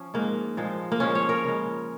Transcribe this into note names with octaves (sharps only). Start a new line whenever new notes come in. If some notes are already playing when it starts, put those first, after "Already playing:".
Already playing: F3 C#4
G#2 G#3 A#3
A#2 F3 G#3
A#3
A#2 F3 G#3 C#4
C#5
A#4
C#3 G#3